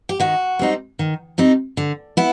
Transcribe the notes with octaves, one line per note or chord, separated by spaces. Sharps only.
G4
D#3 F#4
G3 C4 D#4
D#3
G3 C4 D#4
D3
B3 E4